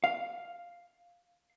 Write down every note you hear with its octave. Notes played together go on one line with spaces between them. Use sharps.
F5